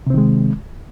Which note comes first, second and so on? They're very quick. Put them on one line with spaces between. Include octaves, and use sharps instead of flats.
C3 C4 D#3 G#3